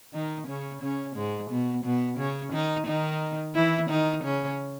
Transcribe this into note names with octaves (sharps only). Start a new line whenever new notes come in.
D#3 D#4
C#3 C#4
C#3 C#4
G#2 G#3
B2 B3
B2 B3
C#3 C#4
D#3 D#4
D#3 D#4
E3 E4
D#3 D#4
C#3 C#4